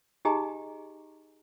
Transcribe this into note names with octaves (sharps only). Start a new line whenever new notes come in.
D#4 G4 G#4 D#5 G#5 A#5